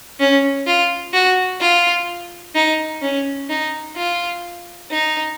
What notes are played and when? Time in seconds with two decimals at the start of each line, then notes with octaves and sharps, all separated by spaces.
0.20 C#4
0.67 F4
1.13 F#4
1.61 F4
2.55 D#4
3.02 C#4
3.49 D#4
3.97 F4
4.90 D#4